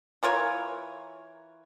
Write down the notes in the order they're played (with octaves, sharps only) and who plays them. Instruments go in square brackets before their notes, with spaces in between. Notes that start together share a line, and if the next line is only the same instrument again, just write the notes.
[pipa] E3 F4 A#4 C#5